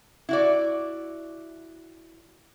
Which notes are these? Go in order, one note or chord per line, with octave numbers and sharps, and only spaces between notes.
E4 F#4 D5